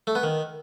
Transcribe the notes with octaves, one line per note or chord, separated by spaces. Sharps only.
A3
B3
D#3